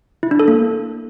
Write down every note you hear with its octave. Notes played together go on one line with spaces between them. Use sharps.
E4
D4
A4
A#3